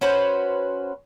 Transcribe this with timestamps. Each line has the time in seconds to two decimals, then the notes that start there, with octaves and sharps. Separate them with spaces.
0.01 C#4 F#4 B4 C5